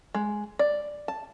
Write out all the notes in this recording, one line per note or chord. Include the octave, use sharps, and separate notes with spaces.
G#3
D5
A5